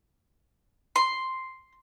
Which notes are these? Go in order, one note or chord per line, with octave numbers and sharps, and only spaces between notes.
C6